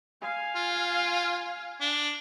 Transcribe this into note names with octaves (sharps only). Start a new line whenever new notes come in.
F5 G#5
F4
D4